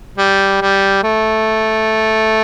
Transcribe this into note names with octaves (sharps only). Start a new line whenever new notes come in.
G3
G3
A3